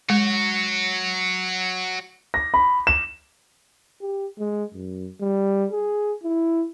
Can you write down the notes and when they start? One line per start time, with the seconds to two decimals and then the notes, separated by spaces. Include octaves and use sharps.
0.10 G#3 F#4 C#5
2.34 A#6
2.54 B5
2.87 E7
4.01 G4
4.39 G#3
4.74 F#2
5.21 G3
5.72 G#4
6.23 E4